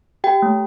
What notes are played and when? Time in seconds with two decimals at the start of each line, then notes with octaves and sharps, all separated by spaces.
0.24 G4 G5
0.42 A3